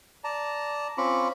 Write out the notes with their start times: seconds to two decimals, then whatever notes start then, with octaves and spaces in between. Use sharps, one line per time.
0.24 D5 A5 A#5
0.98 C4 C#4 F4 B5 C#6 D6